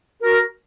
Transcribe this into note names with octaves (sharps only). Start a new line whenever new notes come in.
F#4 A#4